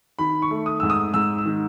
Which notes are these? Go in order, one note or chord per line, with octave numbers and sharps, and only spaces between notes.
D#3 B5
C#6
A3
D#6
G#2 E6
D#6
G#2 E6
E6
D#3